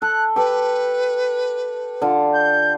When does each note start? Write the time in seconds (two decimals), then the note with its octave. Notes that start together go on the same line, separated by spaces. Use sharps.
0.02 A4 F#6
0.36 G4 A4 B4
2.02 D3 F4
2.33 G6